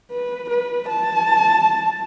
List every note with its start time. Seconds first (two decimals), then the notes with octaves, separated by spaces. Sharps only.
0.11 B4
0.50 B4
0.89 A5